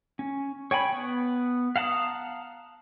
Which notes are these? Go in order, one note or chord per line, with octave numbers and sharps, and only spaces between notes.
C#4
C#5 G5 G#5 B5
B3
F5 F#5 A5 A#5 D#6